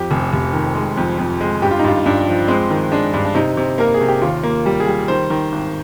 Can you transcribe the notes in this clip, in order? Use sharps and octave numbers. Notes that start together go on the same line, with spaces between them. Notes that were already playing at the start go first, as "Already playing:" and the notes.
Already playing: F2 G4
F1
F1
D#3
G#3
F2
F2
G#3
G2 G4
F4
D#4
G2 F4
G2 D4
F3
G#3 C4
D#3
G#3 D4
G2
D4
C3 D#4
C3
A#3 A#4
G#4
C3
G4
D#2 F4
A#3
G3
G#4
G3
D#3 C5
D#3
G#1